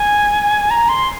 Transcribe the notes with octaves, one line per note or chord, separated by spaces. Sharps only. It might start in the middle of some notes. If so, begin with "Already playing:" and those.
Already playing: G#5
A#5
C6